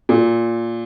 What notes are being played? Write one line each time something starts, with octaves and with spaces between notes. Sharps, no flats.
A#2